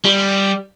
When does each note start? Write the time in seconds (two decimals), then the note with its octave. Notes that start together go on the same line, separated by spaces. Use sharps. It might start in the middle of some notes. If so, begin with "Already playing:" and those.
0.05 G3